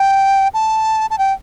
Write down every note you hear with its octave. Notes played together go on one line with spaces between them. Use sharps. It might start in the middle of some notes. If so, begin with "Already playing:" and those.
Already playing: G5
A5
A5
G5